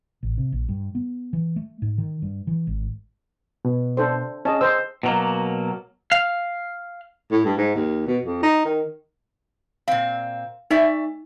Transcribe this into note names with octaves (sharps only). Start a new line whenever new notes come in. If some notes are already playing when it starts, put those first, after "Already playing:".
A1
C3
A#1
G2
B3
E3
A3
G#2
D#3
G2
E3
G#1
B2
D4 A4 C5
C#4 G#4 D#5 A5
C5 D#5 E6
B2 F#3 A#3
F5
A2
G2
G#2
D#2
B2
F2
D#4
D#3
A#2 C4 F5
A3 D#4 D5 E5